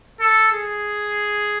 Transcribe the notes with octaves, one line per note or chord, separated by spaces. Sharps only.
A4
G#4